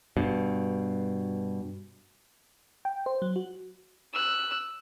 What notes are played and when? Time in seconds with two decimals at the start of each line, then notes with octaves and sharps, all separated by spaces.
0.17 G2 B2
2.85 G5
3.06 C5
3.22 F#3
3.36 F#4
4.13 E6 F#6